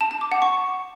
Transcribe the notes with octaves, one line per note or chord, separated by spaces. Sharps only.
A5
A5
D6
F#5
C#6